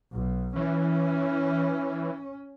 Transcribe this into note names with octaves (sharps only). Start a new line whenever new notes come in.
B1
E3 C#4